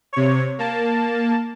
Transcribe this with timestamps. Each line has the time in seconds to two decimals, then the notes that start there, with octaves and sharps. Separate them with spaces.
0.13 C3 C#5
0.58 A#3 A5